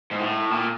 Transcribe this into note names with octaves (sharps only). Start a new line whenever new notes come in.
G#2
A2
A#2